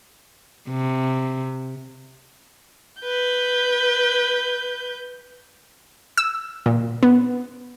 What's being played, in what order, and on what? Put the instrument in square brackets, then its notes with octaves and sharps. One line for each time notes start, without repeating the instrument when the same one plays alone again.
[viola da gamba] C3
[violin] B4 G6
[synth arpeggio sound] E6
A#2
B3